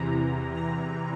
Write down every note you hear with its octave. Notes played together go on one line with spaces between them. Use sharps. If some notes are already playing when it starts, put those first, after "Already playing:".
Already playing: E2 C3 E3 A#5
A#5